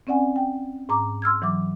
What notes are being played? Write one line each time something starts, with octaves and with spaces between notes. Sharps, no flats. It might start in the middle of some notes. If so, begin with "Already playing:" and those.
C4 C#4 D5 F#5 G#5
G5
G#2 A#5 D6
C6 E6 F6 G#6
E3 F#3 D6